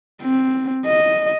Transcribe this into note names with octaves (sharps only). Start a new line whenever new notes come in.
C4
D#5